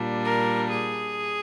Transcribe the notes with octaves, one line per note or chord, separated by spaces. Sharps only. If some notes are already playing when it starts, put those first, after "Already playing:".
Already playing: A#2 G3 D4
A#4
G#4